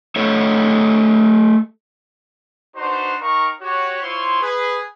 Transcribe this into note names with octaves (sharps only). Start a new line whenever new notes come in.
A3 A4 C#5 D#5
D4 D#4 F#4 B4 C5
D#4 A#4 F5 G5 A#5 C#6
F#4 G4 C#5
E4 F4 C5 C#5 C6 C#6
G#4 B4